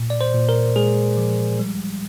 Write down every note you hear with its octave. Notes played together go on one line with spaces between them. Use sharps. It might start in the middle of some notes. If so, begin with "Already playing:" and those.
Already playing: A#2
D5
C5
A#2
A#4
G#3 G#4
F3
G3